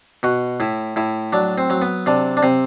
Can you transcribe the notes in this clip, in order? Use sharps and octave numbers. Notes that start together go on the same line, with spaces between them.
B2 F#4
A2 E4
A2 E4
F#3 D4
C4
F#3
B3
C3 D4
D4
C3 C4